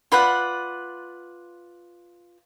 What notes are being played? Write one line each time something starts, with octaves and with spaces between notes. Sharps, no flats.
F4 B4 D5 F#5